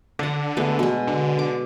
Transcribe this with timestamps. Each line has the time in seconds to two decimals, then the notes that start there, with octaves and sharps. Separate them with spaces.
0.19 D3 D4 F#5
0.57 G#3 A3 B3
0.79 B2 G#3
1.07 D3
1.39 D6